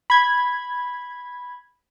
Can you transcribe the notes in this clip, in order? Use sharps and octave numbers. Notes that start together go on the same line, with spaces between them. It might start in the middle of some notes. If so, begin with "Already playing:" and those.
B5 G#6